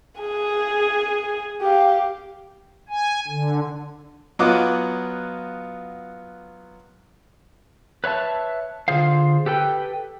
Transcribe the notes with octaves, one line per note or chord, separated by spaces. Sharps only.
G#4 G#5
G4 F5
G#5
D3
F#3 B3 F4 D#5 F#5 D6
B4 C#5 E5 A5
D3 F4 G#4 C5 F5
G4 A4 B4 G5